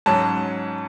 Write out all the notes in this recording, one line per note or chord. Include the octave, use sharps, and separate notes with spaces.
G#2 F#3 C#4 A5